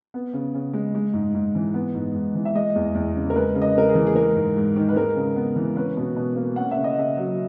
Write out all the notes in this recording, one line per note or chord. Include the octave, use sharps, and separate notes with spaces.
B3
C#3
C#3
G#3
G#3
G#2
G#2
E3
B3
G#2
G#2
E3
E5
G#3 D#5
E2
E2
C#3
A#4
G#3 B4
C#3
D#5
C#3 A#4
G#4
E3
G#4
G#3 A#4
G#2
G#2
D#3
B4
G#3 A#4
C#3
B3
E3
C#4 B4
B2
B2
A#3
C#4 F#5
E5
C#3
D#5
C#3 E5
F#3